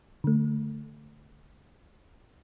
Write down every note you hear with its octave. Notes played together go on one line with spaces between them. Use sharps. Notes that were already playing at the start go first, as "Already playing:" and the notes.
D3 A3